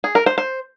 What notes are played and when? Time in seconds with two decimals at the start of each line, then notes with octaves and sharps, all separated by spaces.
0.04 G#4
0.15 A#4
0.26 C5
0.38 C5